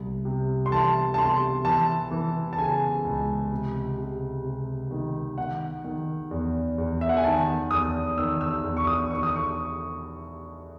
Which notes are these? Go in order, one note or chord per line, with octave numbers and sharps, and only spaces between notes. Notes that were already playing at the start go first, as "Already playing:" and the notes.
Already playing: C2
C3
C6
E3 A5
A5
C3 C6
E3 A5
E3
A5
C#3 G#5
C#2
C3
C3
C3
D#3
D#3 F#5
D#3
E2
E2
E5
F#5
G#5
D#3 A5
E2 D#6
D#3 E6
E6
E2
C#6
D#6
D#3 C#6
D#6
C#6